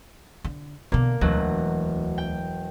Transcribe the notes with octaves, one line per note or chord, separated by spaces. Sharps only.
D3
B2 D3 A#3
E1 D2 F#3 F#4
G5